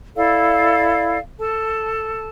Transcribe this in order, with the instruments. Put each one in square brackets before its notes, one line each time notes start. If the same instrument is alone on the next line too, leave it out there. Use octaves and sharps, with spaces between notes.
[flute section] E4 A4 D5 F5
A4 A5